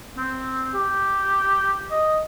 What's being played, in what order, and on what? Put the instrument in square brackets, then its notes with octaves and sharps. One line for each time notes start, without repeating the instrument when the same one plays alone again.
[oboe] C4
G4
D#5